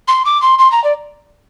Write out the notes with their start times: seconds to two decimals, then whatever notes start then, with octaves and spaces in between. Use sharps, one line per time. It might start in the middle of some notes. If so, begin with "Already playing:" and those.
0.08 C6
0.25 D6
0.42 C6
0.59 C6
0.72 A#5
0.84 D5